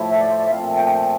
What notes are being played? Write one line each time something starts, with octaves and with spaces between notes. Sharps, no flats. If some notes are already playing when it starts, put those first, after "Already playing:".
Already playing: A2 F3 A3 E4
E5
D5
C5
D5
E5
A#2 F3 A3 C4 F5
G5